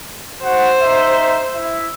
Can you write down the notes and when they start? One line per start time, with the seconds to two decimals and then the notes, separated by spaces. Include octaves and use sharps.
0.44 F#4 C5 F#5
0.82 D#4 E5
1.55 E4 E5